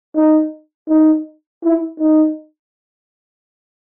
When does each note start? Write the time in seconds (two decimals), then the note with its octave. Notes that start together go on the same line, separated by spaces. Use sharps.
0.15 D#4
0.89 D#4
1.64 E4
2.00 D#4